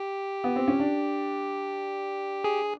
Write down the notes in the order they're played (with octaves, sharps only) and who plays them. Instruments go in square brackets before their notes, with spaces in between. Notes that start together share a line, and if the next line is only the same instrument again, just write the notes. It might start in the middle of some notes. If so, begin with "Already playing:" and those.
Already playing: [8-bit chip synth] G4
[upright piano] B3
C4
C#4
D4
[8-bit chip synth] G#4